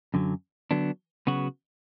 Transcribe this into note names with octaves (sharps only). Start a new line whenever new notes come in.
F#2 D3 F#3
D3 F#3 B3 D4
C#3 F#3 B3 F#4